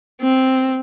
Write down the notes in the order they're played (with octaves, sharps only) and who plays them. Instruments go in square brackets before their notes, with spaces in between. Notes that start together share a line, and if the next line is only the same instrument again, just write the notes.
[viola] C4